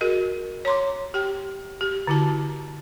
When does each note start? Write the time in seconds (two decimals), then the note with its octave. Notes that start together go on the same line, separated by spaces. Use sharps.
0.01 F#4 G#4 A#4 D#5
0.65 C#5 A#5 C6 D6
1.14 G4 G5
1.81 G4
2.07 D3 E4 F#4 A5